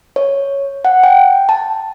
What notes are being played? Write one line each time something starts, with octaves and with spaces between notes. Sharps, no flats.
C#5
F#5
G5
A5